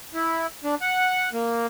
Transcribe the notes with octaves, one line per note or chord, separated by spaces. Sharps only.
E4
D4
F#5
A#3